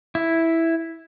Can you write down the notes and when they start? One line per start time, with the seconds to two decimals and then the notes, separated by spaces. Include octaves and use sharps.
0.15 E4